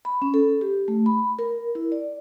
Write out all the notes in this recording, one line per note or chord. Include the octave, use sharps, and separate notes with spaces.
B5
C#4
A4
G4
A3
B5
A#4
E4
D5